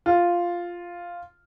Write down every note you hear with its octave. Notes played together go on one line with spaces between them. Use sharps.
F4